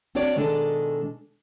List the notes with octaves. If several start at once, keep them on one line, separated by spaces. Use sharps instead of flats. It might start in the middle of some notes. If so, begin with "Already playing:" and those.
C4 D4 F#4 C#5 D5
B2 D#3 G#3 D4 A4